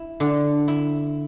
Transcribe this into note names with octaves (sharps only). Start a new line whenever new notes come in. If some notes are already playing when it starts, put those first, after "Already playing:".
Already playing: E4
D3
E4